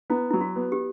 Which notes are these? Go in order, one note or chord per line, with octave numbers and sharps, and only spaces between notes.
B3 E4
F#3 E4
F#4
B3
G4